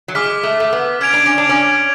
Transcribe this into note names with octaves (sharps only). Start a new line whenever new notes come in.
F#3
G#3 D6 F6 B6
A3
A3
B3
C#4 F6 G#6 D7 F7
D4
C#4
D4
C#4